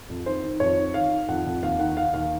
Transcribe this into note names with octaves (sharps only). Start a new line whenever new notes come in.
F2
D#3 C5
D#3
F2 C#5
D#3
D#3 F5
D#3
F2 F#5
F2
D#2 F5
D#3 F#5
D#3 F5
D#2 F5